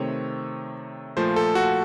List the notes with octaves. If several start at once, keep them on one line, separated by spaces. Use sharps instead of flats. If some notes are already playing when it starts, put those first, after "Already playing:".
Already playing: C3 D#3 A3 C4 C#5
A#2 F3 A3 C5
A4
F#4